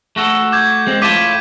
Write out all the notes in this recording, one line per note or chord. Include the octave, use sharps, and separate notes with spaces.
A3 F#4 A4
D6 G6 G#6
G#3 C4
A2 F4 A5 D6 B6 D#7